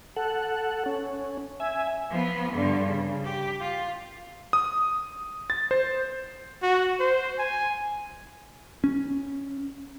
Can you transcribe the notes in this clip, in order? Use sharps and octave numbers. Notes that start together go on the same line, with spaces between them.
A4 F#5
C#4
E5 G#5
F3 B3
G2 D3
C#3
G4
F4
D#6
A6
C5
F#4
C5
G#5
C#4